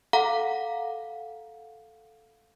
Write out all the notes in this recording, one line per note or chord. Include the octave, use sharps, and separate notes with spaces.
A4 F5 F#5 A#5